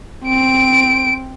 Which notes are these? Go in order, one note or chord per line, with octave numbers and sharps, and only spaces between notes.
C4 D7